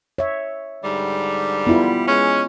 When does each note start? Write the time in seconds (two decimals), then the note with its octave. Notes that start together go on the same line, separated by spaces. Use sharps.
0.18 C#5 E5
0.84 G#2 D3 G3
1.67 B3 E4 F4
2.07 G#3 C#4